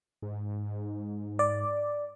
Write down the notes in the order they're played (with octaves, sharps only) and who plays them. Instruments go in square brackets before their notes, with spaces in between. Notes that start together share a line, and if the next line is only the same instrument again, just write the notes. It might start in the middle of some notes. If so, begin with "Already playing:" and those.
[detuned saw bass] G#2
[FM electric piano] D5